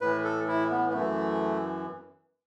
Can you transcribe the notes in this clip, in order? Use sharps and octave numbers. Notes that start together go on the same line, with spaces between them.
A2 E3 B4
A4
E4
B3
B3
F#2 E3 A3